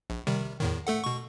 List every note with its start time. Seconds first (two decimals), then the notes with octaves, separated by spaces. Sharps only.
0.10 A#1
0.27 C3 D#3 G3
0.60 E2 A2 D#3
0.87 A3 A4 F#5
1.04 B2 C#6